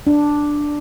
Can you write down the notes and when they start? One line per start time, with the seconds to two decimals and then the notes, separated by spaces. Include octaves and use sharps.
0.07 D4